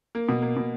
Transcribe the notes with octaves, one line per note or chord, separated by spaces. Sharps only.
A#3
B2
A#3
B2